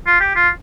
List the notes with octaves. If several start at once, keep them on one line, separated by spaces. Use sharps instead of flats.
F4
G4
F4